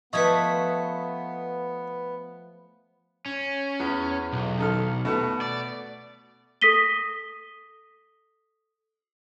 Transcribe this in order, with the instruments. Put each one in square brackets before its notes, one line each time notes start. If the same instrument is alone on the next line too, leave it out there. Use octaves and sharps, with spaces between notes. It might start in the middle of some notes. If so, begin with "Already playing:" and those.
[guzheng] F3 A3 [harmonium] B3 [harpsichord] B4 D#5 [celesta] C#6 D#6 G#6
[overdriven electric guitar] C#4
[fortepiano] E2
[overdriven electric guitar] B1
[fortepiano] D#3 A4 F6
B2 A3 B3
[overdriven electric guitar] D5
[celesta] A4 D#6 A#6 B6 D#7 G7